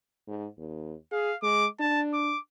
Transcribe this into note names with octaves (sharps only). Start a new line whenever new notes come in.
G#2
D#2
G#4 F5
G#3 D6
D4 A5
D6